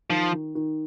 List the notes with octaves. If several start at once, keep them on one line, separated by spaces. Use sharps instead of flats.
D#3 F3
D#3
D#3